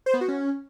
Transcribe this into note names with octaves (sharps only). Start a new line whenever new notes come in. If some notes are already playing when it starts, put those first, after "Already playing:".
C5
B3
F#4
C#4